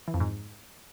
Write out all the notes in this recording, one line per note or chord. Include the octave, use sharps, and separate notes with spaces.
E3
F2
G#2